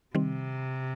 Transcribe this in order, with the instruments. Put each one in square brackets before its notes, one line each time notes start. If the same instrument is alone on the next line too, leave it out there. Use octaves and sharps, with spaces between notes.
[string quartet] C3 [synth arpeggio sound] D#3 G3 C4